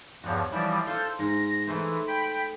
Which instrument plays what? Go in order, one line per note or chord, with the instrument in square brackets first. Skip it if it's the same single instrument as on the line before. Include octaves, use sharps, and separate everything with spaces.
[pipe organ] E2 G2 F3 [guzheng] F#4 C#5
[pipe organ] E3 F3 G3 [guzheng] E4 D5
[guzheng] F4 C5 F5 [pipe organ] A4 G6
[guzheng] G#2 [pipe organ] A#6
[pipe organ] E3 [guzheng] A3 D#4 C5
[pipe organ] G5 B5